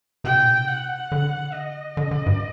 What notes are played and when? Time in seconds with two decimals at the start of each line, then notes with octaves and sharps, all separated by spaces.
0.24 C3 G5
0.34 A#2
0.45 C3
0.68 F#5
1.12 D3
1.54 D#5
1.97 D3
2.11 D3
2.26 G2